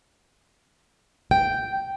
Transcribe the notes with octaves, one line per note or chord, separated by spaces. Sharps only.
G5